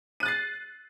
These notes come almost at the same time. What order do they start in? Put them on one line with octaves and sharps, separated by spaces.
D#7 F#6 A6 C7